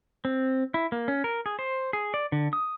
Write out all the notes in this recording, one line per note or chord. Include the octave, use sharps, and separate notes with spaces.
C4
E4
A#3
C#4
A#4
G#4
C5
G#4
D5
D3
D#6